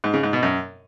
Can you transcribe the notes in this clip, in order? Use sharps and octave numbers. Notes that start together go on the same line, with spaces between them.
G#2
C#3
G#2
B2
F#2